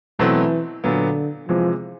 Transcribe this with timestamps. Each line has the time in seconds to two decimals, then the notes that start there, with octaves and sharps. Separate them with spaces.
0.19 B2 E3 F#3 A3 C4
0.84 A#2 D3 F#3 B3
1.49 C3 E3 F3 G#3